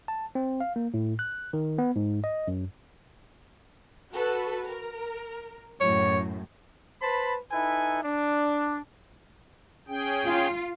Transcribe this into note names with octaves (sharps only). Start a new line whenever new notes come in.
A5
C4
F5
A#3
A2
F#6
D#3
B3
G#2
D#5
F#2
F#4 A4 B4
A#4
F#2 A2 C#5
B4 C5 A5 B5
D#4 E4 A4 B4 G#5
D4
C#4 G#4 G5
F4